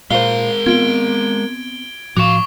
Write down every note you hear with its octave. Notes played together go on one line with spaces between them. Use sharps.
A#2 G#3 A#4 C5 F5 G7
B3 C4 F4 G#6 D7 G7
A2 F3 F#4 F5 C#6 D6